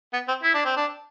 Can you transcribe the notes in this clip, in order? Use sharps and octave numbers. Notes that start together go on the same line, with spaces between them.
B3
C4
E4
D4
C4
D4